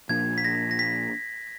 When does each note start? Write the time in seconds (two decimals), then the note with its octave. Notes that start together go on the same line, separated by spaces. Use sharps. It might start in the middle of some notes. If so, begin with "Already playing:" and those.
0.09 A#2 F3 A#3 D4 G#6
0.38 B6
0.45 A#6
0.71 A#6
0.79 B6